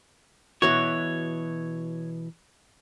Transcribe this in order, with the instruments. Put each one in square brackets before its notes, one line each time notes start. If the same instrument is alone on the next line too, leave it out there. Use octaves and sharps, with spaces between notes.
[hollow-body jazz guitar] B2 E3 F#4 [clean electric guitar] C#5